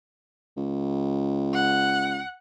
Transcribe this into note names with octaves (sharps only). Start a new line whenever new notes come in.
C#2
F#5